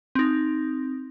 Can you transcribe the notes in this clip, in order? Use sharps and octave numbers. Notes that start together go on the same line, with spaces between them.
C4 D#4